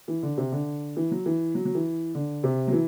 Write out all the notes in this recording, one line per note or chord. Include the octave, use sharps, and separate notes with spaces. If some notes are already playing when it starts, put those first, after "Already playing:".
E3
D3
C3
D3
E3
F#3
E3
F#3
F#3
E3
D3
C3
F#3
E3